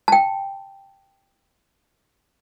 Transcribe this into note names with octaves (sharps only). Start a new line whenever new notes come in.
G5 A5